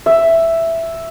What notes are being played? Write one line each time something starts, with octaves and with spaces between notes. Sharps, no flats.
E5